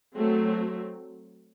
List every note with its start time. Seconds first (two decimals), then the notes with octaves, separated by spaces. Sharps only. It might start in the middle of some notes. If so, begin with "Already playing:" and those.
0.16 F#3 A3 C4